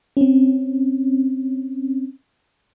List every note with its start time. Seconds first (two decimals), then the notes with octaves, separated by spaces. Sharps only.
0.17 C4 C#4